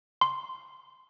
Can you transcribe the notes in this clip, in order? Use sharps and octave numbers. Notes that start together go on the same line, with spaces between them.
C6